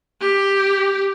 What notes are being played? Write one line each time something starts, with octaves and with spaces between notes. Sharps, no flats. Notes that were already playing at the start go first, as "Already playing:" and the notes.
G4